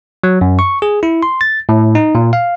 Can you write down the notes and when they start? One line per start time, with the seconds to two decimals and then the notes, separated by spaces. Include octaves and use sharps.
0.24 F#3
0.41 F#2
0.59 C#6
0.82 G#4
1.03 E4
1.23 C6
1.41 A6
1.69 A2
1.95 D#4
2.15 A#2
2.33 F5